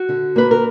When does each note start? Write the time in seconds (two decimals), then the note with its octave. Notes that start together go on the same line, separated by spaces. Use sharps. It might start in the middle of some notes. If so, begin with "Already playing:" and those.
Already playing: F#4
0.09 D3
0.36 A#3 B4
0.51 A#4